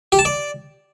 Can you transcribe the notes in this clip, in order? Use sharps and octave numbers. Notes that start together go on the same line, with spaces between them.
G4
A5
D5